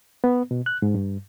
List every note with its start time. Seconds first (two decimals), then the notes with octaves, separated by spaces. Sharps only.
0.24 B3
0.51 B2
0.66 F#6
0.82 G#2
0.94 G2